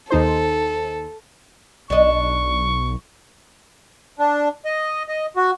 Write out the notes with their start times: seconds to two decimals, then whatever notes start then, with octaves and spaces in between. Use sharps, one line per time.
0.10 D#2 D#4 A4 C5
1.90 B1 D4 D#5 C#6
4.19 D4
4.65 D#5
5.08 D#5
5.36 F#4